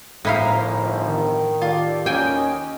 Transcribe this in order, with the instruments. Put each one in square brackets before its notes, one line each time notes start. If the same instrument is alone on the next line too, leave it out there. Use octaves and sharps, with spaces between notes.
[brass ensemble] G1 F3 [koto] A2 E4 F5 [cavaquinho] D#4 A#4
[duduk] D#3
[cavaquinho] F4 [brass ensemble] G4 A4 D5
[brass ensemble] D#2 D#5 [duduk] C#4 [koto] G5 G#5